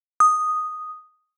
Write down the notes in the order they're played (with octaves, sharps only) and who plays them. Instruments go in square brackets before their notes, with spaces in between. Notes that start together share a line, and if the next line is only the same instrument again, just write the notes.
[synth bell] D#6